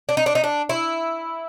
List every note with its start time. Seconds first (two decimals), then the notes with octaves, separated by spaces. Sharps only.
0.09 D4
0.17 D#4
0.26 D4
0.35 D#4
0.44 D4
0.69 E4